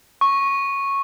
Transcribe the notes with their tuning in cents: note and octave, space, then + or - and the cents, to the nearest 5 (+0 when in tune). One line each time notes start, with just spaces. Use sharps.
C#6 -10